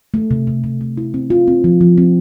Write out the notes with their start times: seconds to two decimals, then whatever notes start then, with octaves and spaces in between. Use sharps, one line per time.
0.14 A3
0.31 C3
0.47 C3
0.64 C3
0.81 A3
0.97 E4
1.14 C4
1.30 F4
1.48 C4
1.64 F3
1.81 F3
1.98 C4